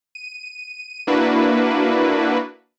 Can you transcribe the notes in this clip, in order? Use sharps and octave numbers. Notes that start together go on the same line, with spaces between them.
D#7
A#3 D4 E4 F#4 B4